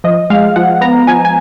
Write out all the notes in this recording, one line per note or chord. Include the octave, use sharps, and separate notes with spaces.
F3 D#5
G#3 F5
F3 F#5
B3 A#5
F3 G#5
G#5